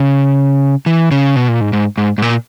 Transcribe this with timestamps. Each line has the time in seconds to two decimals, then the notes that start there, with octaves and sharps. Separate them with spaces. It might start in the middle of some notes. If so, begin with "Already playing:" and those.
Already playing: C#3
0.86 E3
1.11 C#3
1.36 B2
1.48 A#2
1.61 G#2
1.73 G#2
1.98 G#2
2.18 G#2
2.22 A#2